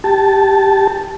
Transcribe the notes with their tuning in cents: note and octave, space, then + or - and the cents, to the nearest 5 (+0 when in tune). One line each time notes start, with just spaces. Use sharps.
G4 +0 A5 -5